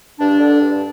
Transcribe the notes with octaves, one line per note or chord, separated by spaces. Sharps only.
G2 D4
D3
G2